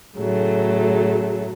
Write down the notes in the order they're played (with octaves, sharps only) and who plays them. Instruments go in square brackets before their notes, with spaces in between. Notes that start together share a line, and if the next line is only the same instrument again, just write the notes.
[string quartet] A2 C#3 F#3 A3